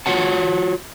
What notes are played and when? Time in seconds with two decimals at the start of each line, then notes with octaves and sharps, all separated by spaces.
0.06 F4 F#4 C#5 F#5 A5